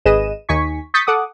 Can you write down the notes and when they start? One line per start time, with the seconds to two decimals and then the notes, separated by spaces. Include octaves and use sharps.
0.05 G#1 G#4 B4 D#5 D#7 E7
0.49 D#2 D#4 G#5 C#6 B6
0.94 C#6 D#6 G6 A6 B6 C#7
1.07 A4 F#5 D6 D#6